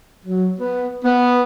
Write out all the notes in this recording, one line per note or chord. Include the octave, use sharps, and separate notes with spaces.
F#3
B3
B3